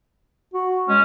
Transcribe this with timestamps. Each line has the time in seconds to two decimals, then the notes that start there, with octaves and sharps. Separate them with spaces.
0.54 F#4
0.89 G#3 C#4